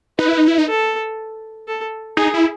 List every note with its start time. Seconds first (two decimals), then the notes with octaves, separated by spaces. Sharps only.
0.19 D#4 B4
0.28 E4
0.38 D#4
0.48 E4
0.58 D#4
0.68 A4
1.68 A4
2.17 D#4 G#4
2.34 E4